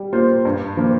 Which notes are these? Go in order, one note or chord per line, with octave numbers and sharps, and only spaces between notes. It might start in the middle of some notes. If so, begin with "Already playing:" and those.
Already playing: G3
A#3 F4 C5
G2
F3 A#3